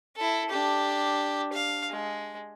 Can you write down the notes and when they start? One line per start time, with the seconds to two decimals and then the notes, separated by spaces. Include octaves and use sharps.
0.16 E4 A4
0.50 D4 G4
1.52 F5
1.90 G#3